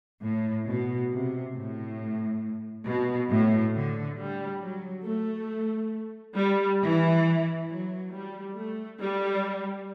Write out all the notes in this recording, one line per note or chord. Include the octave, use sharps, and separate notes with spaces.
A2
B2
C3
A2
B2
A2
D3
G3
F#3
A3
G3
E3
F#3
G3
A3
G3